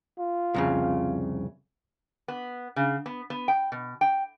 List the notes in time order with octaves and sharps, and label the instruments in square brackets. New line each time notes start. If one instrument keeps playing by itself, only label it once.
[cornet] F4
[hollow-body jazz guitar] C2 F2 C#3
[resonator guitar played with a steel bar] B3
C#3
B3
B3
G5
B2
G5